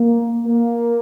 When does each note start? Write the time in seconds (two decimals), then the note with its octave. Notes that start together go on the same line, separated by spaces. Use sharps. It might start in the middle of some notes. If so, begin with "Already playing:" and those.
Already playing: A#3
0.46 A#3